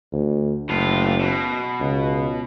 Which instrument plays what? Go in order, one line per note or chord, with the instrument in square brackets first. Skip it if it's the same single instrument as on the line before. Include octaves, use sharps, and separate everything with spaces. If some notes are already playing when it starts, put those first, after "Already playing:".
[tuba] D2
[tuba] F#1 [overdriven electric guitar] A2 F4
[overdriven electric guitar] B2
[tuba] C#2